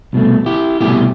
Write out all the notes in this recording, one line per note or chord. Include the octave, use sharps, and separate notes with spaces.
C2 B2 A3
E4 G4
C2 B2 A3 E4 G4